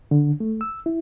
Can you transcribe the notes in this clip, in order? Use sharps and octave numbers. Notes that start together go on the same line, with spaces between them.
D3
A3
E6
E4